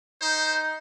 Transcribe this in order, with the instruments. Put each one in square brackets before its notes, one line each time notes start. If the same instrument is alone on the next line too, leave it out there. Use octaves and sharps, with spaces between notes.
[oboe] D#4 [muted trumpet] C5